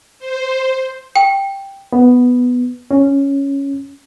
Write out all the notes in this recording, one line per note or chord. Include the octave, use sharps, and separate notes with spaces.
C5
G5
B3
C#4